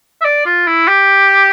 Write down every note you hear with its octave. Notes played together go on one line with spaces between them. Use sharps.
E5
D5
F4
E4
G4